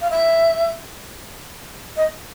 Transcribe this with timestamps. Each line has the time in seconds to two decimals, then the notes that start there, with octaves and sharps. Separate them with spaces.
0.01 F5
0.11 E5
1.97 D#5